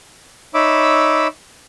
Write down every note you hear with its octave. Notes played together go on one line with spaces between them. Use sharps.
D#4 C#5 E5 B5 D6 E6